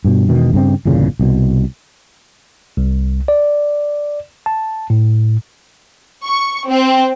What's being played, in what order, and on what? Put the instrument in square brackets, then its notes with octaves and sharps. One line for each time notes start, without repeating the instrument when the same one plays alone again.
[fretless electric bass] G2 B2
E1 B2 D#3
G2 C#3 C4
G1 E2 A#2 C#3
C2 B2
[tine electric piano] C2
D5
A5
A2
[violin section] C#6
C4